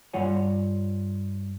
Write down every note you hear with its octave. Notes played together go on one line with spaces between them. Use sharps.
G2 G3 F4 C#5 F#5 G#5